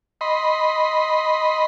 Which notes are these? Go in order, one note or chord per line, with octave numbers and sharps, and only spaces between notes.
D#5 B5 C6